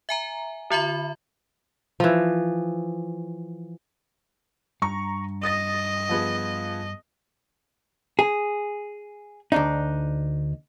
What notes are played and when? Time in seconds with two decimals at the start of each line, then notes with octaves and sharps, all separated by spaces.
0.09 E5 G#5 A#5
0.70 D3 F4 E5 B5
2.00 E3 F3
4.82 G2 A#5 C#6
5.43 D#5 D#6 A6 A#6
6.09 F3 B3 G#4
8.19 G#4
9.52 D2 D4 D#4